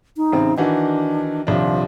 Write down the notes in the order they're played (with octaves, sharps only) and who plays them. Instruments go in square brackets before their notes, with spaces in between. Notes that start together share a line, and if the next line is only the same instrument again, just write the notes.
[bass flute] D#4
[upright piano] A1 C#3 C4
[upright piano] D#3 E3 F#4 [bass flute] D4
[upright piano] D#1 C2 D4 [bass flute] F3